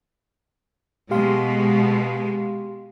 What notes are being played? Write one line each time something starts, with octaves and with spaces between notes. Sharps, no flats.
B2 G#3 G4 F5 C6